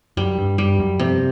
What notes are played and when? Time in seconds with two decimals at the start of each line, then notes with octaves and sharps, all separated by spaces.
0.17 F#2 G3
0.38 G2
0.58 G2 G3
0.80 F#2
1.00 F2 C3